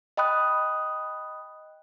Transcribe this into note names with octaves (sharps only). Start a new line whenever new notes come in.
D#5 G5 B5 D#6 F#6